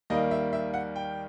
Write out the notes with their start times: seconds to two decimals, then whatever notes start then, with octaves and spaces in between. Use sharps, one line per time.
0.10 D#2 D#3 G3 A#3 D#5
0.31 E5
0.53 E5
0.74 F#5
0.96 G5